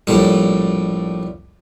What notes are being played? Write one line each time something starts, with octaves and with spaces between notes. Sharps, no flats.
A#1 A2 G3